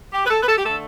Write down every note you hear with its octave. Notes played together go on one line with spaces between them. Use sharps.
G4
B4
A4
B4
A4
G4
D3 A3 A4